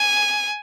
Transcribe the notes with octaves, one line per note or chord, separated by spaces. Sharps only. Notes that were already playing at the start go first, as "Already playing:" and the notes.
Already playing: G#5